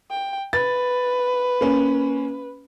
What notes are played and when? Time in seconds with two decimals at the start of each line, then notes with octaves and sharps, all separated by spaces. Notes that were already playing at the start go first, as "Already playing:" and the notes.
0.10 G5
0.53 B4 A6
1.61 A#3 C#4